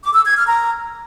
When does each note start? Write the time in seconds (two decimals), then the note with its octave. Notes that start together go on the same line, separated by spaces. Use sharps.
0.04 D6
0.15 E6
0.26 G#6
0.37 F6
0.48 A#5